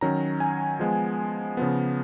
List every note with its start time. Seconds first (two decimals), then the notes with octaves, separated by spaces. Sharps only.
0.01 D#3 F#3 C#4 A#5
0.40 G#5
0.80 F3 G#3 B3
1.57 C#3 F3 B3